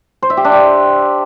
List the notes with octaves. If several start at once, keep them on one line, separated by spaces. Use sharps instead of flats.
C5
E5
G4
D4
G5